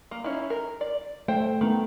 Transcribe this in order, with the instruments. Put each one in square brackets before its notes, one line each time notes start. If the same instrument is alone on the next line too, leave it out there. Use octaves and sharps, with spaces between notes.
[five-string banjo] A#3
C#4 D#4 E4
A#4
D5
[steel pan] A3 [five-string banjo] C5 G5
[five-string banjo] D#3 [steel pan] A3 B3